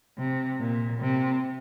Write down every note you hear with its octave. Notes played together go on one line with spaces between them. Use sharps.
C3
A#2
C3